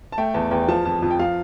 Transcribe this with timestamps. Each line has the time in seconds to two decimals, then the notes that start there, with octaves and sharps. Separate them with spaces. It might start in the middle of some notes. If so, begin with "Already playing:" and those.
0.12 A5
0.18 A3 G5
0.34 E2 A5
0.51 E2 G5
0.62 G5
0.68 F3 A5
0.85 F2 A5
1.02 F2
1.11 G5
1.19 F3 F5